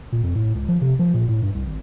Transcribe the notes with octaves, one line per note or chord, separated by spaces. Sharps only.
A#2
F2
A2
C#2
F3
C3
F3
A#2
A2
G2
C2
G#1